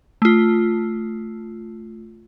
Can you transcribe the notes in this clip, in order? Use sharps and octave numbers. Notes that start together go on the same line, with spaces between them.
A3 F4